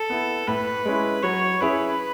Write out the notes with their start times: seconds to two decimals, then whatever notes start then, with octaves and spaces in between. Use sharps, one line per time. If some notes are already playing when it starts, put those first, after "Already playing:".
Already playing: A4
0.10 B3 E4
0.48 A2 B4
0.85 G#3 C#4 E4
1.23 F#3 C#5
1.61 C#4 E4 G#4 B4